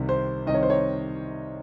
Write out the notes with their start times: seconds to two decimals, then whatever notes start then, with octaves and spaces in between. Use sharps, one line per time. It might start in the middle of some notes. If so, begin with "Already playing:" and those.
Already playing: C2 C3 D#3
0.09 C5
0.47 C2 C3 D#3 D#5
0.54 C#5
0.63 C5
0.70 C#5